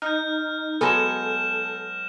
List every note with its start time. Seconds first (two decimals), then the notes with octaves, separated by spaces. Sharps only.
0.02 D#4 F6 G6
0.81 F#3 G#3 B3 A4 F6 A#6 E7